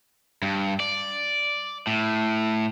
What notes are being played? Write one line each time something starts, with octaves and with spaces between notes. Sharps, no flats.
G2
D5
A2